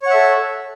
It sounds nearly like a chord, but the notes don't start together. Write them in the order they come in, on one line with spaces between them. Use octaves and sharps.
C#5 F#5 E5 A4